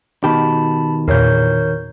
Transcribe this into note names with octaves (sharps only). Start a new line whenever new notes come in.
B2 D#3 G4 A5 B5
E2 A#2 A#4 C#5 G6